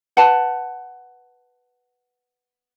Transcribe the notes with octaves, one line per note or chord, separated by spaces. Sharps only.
B4 F#5 A5